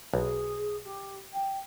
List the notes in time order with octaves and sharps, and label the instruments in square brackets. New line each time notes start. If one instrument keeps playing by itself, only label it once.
[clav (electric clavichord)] B1 [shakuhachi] G#4
[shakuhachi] G4
G5